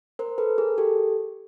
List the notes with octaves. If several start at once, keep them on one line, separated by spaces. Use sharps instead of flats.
A#4 C5
A4 B4
G#4 A#4
G4 A4